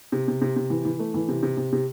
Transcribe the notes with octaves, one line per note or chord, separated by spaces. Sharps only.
C3
C3
C3
C3
E3
E3
A3
E3
C3
C3
C3
C3